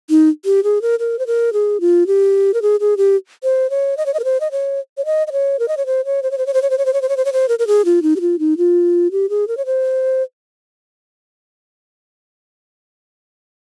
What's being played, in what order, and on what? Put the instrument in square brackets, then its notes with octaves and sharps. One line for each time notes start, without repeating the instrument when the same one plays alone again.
[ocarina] D#4
G4
G#4
A#4
A#4
C5
A#4
G#4
F4
G4
A#4
G#4
G#4
G4
C5
C#5
D#5
C#5
D#5
A#4
C5
D#5
C#5
C#5
D#5
D#5
C#5
A#4
D#5
C#5
C5
C#5
C5
C#5
C5
C#5
C5
C#5
C5
C#5
C5
C#5
C5
C#5
C5
C#5
C5
A#4
A#4
G#4
F4
D#4
G4
F4
D#4
F4
G4
G#4
A#4
C#5
C5